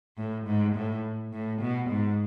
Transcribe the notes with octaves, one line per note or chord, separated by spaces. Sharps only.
A2
G#2
A2
A2
B2
G#2